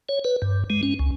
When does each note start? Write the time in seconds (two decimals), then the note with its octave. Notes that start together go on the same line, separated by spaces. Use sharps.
0.09 C#5
0.24 B4
0.42 G2
0.70 G#3
0.83 C#4
0.99 C#2